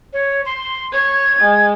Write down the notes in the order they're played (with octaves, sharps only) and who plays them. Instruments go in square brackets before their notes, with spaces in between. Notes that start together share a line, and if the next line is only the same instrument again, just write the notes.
[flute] C#5
C6
[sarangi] C#5 [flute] G#6
[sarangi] G#3